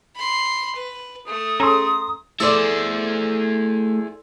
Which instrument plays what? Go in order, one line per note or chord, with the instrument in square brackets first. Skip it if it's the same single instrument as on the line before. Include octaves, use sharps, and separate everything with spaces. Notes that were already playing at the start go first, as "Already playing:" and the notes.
[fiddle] B5 C6
B4
[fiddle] A3 [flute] D#6
[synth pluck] C#4 G#4 A4 [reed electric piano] A#5 C6
[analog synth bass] A3 [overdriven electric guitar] E4 G#4 [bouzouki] A4 C5 D5